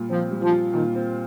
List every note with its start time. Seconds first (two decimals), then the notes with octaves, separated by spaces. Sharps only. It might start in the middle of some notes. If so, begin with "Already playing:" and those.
Already playing: A#2 G3 F4
0.10 F3 C4
0.31 G3
0.42 F3
0.52 F4
0.73 A#2 D#3
0.95 C4